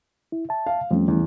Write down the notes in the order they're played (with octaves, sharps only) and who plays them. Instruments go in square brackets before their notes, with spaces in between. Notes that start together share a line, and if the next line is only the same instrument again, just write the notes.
[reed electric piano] E4
E5 A5
[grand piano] F5
[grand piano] F2 [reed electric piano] G3 A3 C#4
[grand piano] E2